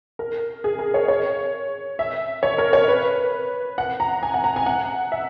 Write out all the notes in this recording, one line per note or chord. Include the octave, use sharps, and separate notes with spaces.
A#4
G#4
A#4
C#5
C#5
E5
C#5
A#4
C#5
B4
F#5
A#5
G#5
F#5
A#5
G#5
F#5
E5